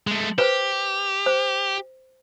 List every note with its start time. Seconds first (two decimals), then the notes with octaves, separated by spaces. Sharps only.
0.07 G#3 A3
0.38 G4 B4 C5
1.26 C5